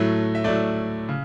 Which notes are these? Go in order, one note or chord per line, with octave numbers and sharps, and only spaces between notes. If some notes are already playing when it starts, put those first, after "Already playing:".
Already playing: A2 F#3 A3
E5
A2 F#3 A3 D5
C#3